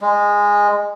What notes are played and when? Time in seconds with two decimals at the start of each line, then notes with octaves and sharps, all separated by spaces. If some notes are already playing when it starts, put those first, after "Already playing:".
0.01 G#3